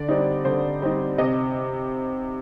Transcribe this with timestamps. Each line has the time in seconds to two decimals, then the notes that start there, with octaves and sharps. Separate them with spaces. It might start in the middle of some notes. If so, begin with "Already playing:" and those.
Already playing: D3 D5
0.08 G3 C4 D#4
0.45 D3 C5
0.82 G3 C4 D#4
1.18 C3 D#5